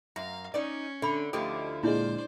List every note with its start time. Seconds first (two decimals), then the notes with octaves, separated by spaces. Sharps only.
0.16 F#2 F5 A#5
0.54 C#4 D#4 D5
1.02 D3 D4 E5 B5
1.33 D2 D3 F3 E4 G4 D#5 D6
1.83 A#2 G#3 D4 E4 C5 D5